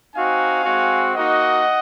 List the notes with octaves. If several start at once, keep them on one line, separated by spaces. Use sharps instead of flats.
C4 D#4 F#4 F5 G#5
G#3 C4 F#4
A#3 D#4 F#4 D#5 F#5